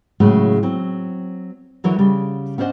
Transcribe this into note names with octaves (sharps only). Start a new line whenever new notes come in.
A2 C#3 F#3 G#3 A3
F#3 C4
D3 E3 F#3 E4 A#4 C#5
C#3 G3
B3 C#4 D4 C5 D#5 F#5